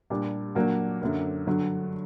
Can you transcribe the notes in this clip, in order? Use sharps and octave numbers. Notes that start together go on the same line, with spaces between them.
A#2 G3 D4 G4
A#2 F#3 A#3 D4 F#4
F#2 D3 F#3 A#3
G2 D3 F#3